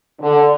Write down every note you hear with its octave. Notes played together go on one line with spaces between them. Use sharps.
D3